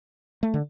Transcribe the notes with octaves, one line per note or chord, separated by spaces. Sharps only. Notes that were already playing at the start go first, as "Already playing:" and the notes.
A3
D3